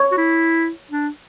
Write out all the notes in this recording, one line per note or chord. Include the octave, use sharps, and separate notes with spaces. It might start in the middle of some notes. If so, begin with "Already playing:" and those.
Already playing: C#5
F#4
E4
D4